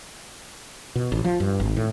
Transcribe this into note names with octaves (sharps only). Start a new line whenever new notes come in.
B2
A1
F3
G2
G#1
A2